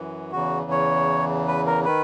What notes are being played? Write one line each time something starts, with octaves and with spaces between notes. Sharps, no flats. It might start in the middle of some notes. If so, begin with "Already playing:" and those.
Already playing: F#2 E3
E2 C#3 E3 F#4
C#5
B4
A#4
D#3 B4